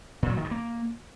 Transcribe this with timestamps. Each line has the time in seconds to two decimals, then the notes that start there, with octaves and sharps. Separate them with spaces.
0.23 A#2
0.30 F#3
0.37 D#3
0.44 G2
0.51 A#3